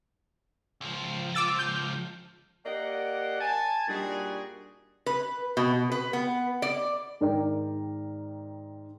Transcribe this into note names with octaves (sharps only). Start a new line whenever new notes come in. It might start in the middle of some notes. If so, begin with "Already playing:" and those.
C#2 F3
D6 E6 A6
G6
A#3 G4 D5 D#5 F#5
G#5 A5
A#2 G3 D4 D#4 F#4 G#4
B4
B2
B4
B3
D5
G#2 D#3 A#4 D5 G5